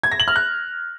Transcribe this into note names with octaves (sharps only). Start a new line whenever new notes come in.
G#6
A#6
F#7
F6
F#6